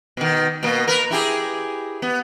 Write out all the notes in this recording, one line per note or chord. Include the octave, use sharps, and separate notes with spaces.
B2 D#3
B2 A#3
A#4 B4
E4 G4 G#4
B3